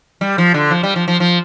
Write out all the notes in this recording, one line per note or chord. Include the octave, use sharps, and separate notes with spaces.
G3
F3
D3
F3
G3
F3
F3
F3